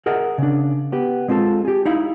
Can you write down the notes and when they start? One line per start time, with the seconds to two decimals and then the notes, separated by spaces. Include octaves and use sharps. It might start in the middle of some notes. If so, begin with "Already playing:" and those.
0.06 G#4 A#4 D#5 E5 F#5
0.38 C#3 D4
0.92 B3 G4
1.28 G#3 C4 F4 G#4 A4
1.65 G4 G#4
1.86 D#4 E4 F5